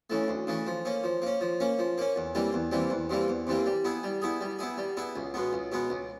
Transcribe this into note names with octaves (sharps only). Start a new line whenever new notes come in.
C#3 E3 A3
D2
C#3 E3 A3
F3
A#3 C#4
F3
A#3 C#4
F3
A#3 C#4
F3
A#3 C#4
E2
C3 E3 G3 A#3
E2
C3 E3 G3 A#3
E2
C3 E3 G3 A#3
E2
C3 E3 G3 A#3
G3
B3 E4 G#4
G3
B3 E4 G#4
G3
B3 E4 G#4
G3
B3 E4 G#4
C#2
B2 G#3 B3
C#2
B2 G#3 B3
C#2